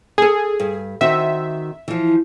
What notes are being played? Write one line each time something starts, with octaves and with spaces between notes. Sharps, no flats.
G#4 A4 G#5
G2
D#3 C4 F#4 E5
E3 F3